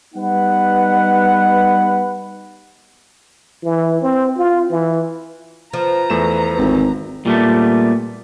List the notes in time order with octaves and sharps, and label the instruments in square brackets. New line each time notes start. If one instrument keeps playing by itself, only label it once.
[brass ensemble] G3 B3 D#4 B4 F#5
[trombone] E3
C4
F4
E3
[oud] F3 [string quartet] B4 A#5
[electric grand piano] E2 A3 E7
[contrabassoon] G#1
[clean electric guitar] A#2 G3 A3 B3